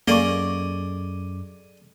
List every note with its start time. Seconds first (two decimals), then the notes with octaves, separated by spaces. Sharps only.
0.08 F#2 A#3 G#4 A4 D5 D#5 C#6 D6